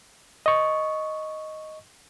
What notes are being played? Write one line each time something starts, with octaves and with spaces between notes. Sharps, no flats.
D#5 C#6